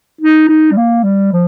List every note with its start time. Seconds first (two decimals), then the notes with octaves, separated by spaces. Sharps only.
0.21 D#4
0.49 D#4
0.71 G3
0.77 A#3
1.04 G3
1.32 F3